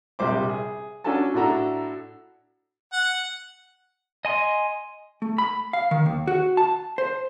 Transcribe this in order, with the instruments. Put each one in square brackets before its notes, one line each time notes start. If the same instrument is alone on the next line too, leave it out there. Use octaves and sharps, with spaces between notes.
[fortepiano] A#1 C3 G3 C5 D6
G#4
C#4 D4 F#4 A4 G#5 A5
A2 D4 E4 F#4 A4 A#5
[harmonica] F#5
[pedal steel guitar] D#5 G#5 C6
[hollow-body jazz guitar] A3
B5
F5
D#3
D#2
F#4
A5
C5